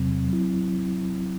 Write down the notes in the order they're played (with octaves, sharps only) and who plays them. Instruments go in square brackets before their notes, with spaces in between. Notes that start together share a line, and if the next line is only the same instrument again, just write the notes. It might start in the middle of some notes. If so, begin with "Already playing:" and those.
Already playing: [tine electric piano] E2 C3 F#3 C4
F#3 C4 E4